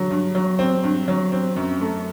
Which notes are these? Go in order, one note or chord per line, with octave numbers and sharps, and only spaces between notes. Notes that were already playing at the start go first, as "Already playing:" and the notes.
Already playing: D3 F#3
G2
F#3
C4
G2
F#3
C4
F#2
A3